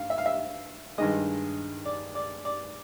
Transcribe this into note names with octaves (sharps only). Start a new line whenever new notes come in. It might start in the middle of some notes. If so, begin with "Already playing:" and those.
Already playing: G2 F5
E5
F5
E5
G2 D#3 G#3 D#5
D5
D5
D5